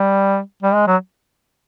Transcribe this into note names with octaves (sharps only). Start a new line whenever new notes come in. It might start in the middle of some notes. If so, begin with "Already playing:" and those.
Already playing: G3
G3
G#3
F#3